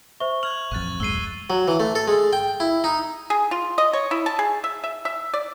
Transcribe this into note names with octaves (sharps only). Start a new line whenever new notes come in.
C5 E5 C#6
F6 F#6 G#6 F7 F#7
A1 F2 C#6 F#6 A6
D#1 F#2 G#3 E6 C7 D#7 G7
F#3
E3
A3
A4
G#3
G5
E4
D#4
G#4
F4
D#5
C#5
E4
A5
G#4
E5
E5
E5
D5